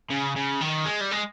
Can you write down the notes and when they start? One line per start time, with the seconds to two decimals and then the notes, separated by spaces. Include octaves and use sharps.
0.11 C#3
0.36 C#3
0.61 D#3
0.86 G#3
1.01 G3
1.12 G#3